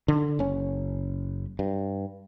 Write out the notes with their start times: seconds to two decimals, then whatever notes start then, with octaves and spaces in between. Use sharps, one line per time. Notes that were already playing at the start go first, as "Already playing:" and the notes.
0.08 D3
0.39 F#1 C#4
1.59 G2